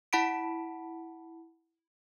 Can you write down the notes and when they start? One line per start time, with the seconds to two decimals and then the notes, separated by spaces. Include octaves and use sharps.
0.13 E4 F#5 A5 B5 B6 D7